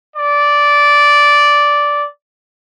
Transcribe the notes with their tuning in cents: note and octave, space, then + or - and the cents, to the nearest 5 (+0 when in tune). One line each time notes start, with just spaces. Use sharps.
D5 -10